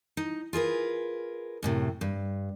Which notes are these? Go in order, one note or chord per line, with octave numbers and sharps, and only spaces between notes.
D#4
F4 G#4 A#4 B4
F#2 A2 C3
G2